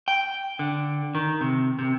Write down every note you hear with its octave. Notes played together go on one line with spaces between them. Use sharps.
G5
D3
D#3
C3
C3